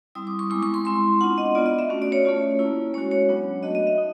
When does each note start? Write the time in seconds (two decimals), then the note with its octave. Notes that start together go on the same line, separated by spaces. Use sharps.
0.15 G3 C4 E4 D#6
0.27 D6
0.39 C#6
0.50 G#3 B3 E4 C#6
0.63 C#6
0.74 C6
0.85 G#3 C4 E4 C6
1.21 B3 D4 F4 F#5
1.38 D#5
1.55 B3 D4 F4 D5
1.66 D#5
1.79 E5
1.89 A3 C#4 F#4
2.02 D5
2.12 C#5
2.25 A3 C#4 F4
2.59 A#3 C#4 E4
2.93 G#3 C#4 F#4 C#5
3.11 C#5
3.29 F#3 B3 D4
3.63 A3 D4 F#4 D#5
3.75 D#5
3.87 E5
3.98 D#4